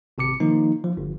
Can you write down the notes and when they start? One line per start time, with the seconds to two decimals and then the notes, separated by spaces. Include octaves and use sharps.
0.18 G#1 C3 D6 C#7
0.40 D#3 F3 A#3 D#4
0.84 F3
0.97 G1